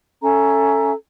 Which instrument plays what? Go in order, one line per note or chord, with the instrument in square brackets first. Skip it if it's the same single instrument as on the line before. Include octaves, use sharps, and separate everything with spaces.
[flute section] C#4 A4 E5 A#5